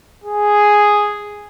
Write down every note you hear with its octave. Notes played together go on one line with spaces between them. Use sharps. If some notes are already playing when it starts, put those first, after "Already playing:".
G#4